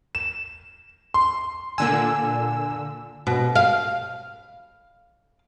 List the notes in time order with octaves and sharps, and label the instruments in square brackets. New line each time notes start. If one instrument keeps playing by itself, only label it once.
[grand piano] E7
C6
[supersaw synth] A#2 D3 E6 [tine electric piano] G#5
[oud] B2
F5